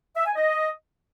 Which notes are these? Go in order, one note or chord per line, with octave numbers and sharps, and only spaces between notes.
E5
G#5
D#5